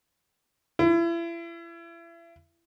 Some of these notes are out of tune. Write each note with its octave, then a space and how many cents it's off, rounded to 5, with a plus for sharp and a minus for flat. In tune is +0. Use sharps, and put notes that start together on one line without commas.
E4 +35